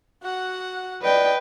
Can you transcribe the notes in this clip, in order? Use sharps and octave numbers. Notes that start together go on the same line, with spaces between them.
F#4 F#5
B4 D5 D#5 G5